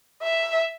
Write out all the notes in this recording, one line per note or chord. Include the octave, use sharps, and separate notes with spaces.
E5